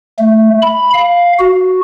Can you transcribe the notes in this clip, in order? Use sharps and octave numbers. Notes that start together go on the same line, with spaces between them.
A3
B5
F5
F#4